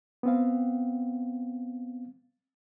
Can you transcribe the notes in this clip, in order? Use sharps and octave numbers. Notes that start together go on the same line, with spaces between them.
B3 C4 F5